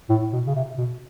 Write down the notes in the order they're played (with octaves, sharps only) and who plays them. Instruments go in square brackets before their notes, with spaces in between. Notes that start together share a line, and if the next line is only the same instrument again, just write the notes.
[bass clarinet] A2
B2
C#3
C3
B2